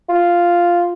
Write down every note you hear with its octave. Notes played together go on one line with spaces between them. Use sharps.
F4